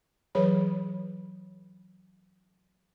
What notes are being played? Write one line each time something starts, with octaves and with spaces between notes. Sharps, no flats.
E3 F#3 G#4 B4 C#5 B5